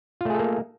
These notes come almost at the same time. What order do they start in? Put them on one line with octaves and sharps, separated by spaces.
F4 A3 G#4 A4 A#3